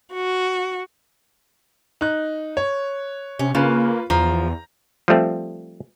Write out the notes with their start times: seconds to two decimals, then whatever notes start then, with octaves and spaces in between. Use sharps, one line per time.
0.14 F#4
2.01 D#4 F#6
2.57 C#5
3.39 C3 C#4
3.55 C#3 A#3 F4 B4
4.10 E2 F3 A#5
5.08 F3 G3 A3 C4